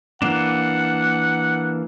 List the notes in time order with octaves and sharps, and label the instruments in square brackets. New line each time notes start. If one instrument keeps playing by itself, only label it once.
[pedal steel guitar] E3 A#3 D4 [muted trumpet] F#5